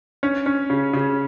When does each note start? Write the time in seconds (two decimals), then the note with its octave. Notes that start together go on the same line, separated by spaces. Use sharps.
0.23 C#4
0.46 C#4
0.70 C#3
0.93 C#3